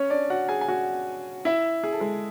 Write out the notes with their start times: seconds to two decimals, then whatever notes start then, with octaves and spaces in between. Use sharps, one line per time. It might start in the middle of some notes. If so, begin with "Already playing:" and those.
Already playing: C#4 C#5
0.10 D4 D5
0.30 F#4 F#5
0.49 G#4 G#5
0.61 G#5
0.68 F#4 F#5
1.45 E4 E5
1.84 G#4
1.93 A4
2.00 G#3 G#4